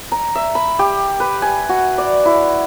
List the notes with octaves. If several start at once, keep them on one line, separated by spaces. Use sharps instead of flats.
A#5
E5
B5
G4
B4
G#5
F#4
D5
E4